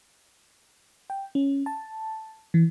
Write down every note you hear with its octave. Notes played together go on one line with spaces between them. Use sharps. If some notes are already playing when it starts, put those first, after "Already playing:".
G5
C#4
A5
E3